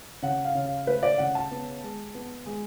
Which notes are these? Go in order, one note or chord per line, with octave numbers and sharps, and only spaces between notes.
C#3 F#5
F5
C#3
F5
A3 B4
D5
C#3 F#5
A5
B3
G#3
B3
G#3